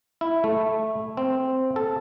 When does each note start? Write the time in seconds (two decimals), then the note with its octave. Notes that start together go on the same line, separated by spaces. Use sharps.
0.21 E4
0.44 A3
1.17 C4
1.76 A4